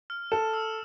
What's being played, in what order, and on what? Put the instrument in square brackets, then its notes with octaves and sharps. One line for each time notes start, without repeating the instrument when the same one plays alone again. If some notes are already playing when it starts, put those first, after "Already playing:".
[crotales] F6
[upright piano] A4 [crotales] E7
[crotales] E6